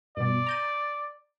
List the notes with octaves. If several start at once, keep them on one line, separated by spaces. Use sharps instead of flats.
G2 B2 D5
A#5 G6 D#7